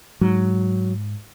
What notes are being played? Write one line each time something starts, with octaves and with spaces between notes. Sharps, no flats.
G#2 F#3